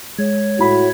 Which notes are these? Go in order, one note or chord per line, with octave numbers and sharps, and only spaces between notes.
G#3 C#5
A2 F#4 B5